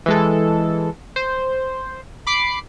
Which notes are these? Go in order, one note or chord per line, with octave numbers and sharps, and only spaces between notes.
E3 G#3 A4
C5
B5 D6 C7